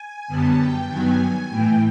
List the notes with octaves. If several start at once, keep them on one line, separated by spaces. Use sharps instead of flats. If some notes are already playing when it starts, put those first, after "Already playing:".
Already playing: G#5
F#2 D3 G3 B3 A5
G5
G2 D#3 F#3 B3 G#5
A2 E3 A3 G5